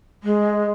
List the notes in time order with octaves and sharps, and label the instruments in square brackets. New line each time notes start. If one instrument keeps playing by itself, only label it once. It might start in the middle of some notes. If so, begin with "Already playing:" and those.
[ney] G#3